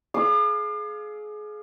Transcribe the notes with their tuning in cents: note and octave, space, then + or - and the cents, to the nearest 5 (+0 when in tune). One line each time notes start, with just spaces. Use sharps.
G#4 +30 F5 +0 D6 +45